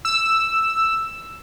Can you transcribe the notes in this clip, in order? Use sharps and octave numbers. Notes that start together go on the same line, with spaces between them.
E6